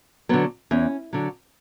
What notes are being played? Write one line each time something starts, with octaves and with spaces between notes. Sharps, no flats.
D3 F#3 B3
E2 C#4
D3 F#3